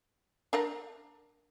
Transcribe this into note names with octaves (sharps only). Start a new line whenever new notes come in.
D4 A#4 F#5